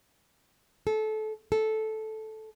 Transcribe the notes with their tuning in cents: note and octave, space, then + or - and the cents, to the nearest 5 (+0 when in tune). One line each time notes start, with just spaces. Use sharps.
A4 -25
A4 -10